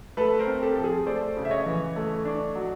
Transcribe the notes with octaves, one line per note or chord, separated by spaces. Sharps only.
A3 A4 B4
A#4 C5
C4
G4 A4
F3 A4
G#4
A3 C5 D5
C#3
E5
C#5 D#5
E3
A3
D4
F#3